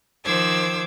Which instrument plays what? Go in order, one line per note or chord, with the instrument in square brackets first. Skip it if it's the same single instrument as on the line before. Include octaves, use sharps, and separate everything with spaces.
[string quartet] D#3 F3 C5 D6 E6 G#6